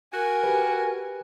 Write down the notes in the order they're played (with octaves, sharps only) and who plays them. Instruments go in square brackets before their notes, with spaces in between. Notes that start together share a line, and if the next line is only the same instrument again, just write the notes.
[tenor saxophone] F#4 [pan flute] A#4 [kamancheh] G#5
[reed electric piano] G4 B4